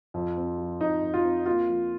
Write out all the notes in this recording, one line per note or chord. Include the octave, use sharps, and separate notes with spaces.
F2
C4
F3
F2 D#4
F2
F4
C4
A#3 F4
F3